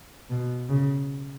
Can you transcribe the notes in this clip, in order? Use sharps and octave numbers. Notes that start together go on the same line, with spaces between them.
B2
C#3